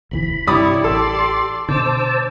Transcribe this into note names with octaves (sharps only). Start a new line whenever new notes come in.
E1 D2 E3 B5
G2 C3 E4 G4 C#5 D5 B5 D#6
A1 A4 D5 C6
B2 D3 C5 A5 D6 E6